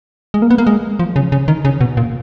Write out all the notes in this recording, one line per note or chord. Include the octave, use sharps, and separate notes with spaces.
G#3
A#3
B3
A#3
G#3
F3
C#3
C#3
D#3
C#3
B2
A#2